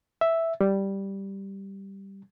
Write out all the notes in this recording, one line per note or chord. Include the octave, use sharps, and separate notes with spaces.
E5
G3